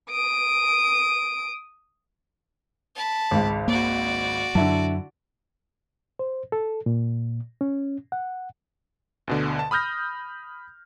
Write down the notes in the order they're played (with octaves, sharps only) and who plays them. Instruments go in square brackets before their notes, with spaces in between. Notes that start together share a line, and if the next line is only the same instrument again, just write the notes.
[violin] D#6 D7
[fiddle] A5 B5
[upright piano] G#1 C#2
[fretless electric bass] A#3 [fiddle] F#4 D5
[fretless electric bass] F#2 F#3 [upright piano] D3 E4 A5
[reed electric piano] C5
A4
A#2
C#4
F#5
[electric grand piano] D2 B2 D3
A5
B5 D#6 F6 G6 A#6